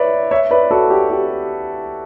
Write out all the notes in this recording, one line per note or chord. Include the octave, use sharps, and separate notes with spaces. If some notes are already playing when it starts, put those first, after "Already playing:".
Already playing: B4 C#5 D5 E5
C#5 E5
B4 D5
F#4 A4
G4
G4